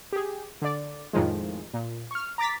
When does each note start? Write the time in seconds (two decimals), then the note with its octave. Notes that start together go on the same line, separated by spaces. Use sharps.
0.13 G4 G#4
0.62 D3 D5
1.13 F2 A2 D#3 F3 G#3
1.74 A#2
2.11 C#6 F6
2.38 A#5 D6 A6 B6